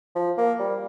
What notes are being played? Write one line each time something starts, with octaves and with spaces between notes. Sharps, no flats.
F3
A#3
G3